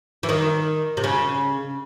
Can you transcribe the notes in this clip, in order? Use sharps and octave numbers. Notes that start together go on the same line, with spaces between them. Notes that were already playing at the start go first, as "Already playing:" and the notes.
E3
D#3
C3
C#3